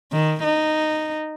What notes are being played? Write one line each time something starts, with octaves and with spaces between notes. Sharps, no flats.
D#3
D#4